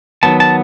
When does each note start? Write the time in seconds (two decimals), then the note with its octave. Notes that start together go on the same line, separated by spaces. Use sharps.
0.23 D#3 F#3 B3 A5
0.40 A5